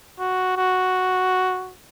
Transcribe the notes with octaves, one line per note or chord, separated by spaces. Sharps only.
F#4
F#4